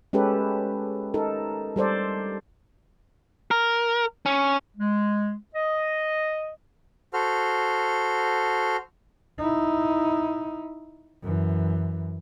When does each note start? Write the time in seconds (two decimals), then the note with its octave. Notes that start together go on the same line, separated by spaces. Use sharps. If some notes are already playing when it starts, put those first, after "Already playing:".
0.13 G#3 C#4 G4 A4 B4
1.14 D#4 A4 A#4
1.76 G3 A4 C5 D5
3.51 A#4
4.26 C#4
4.77 G#3
5.55 D#5
7.13 F#4 A4 C5 F6
9.38 D#4 E4
11.22 F#2 E3